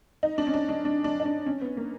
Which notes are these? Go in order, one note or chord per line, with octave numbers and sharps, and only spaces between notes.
D#4
D4
C#4
D4
D4
D4
D4
D#4
D4
C#4
B3
A#3